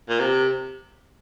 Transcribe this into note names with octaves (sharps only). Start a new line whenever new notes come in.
A#2
C3